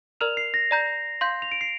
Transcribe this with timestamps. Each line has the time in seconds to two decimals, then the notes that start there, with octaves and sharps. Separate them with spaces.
0.21 A#4 D5 A#5 F6 F7
0.37 C7
0.54 A#6
0.71 D5 A#5 G6
1.21 F5 C6 G6
1.42 F7
1.52 D7
1.61 C7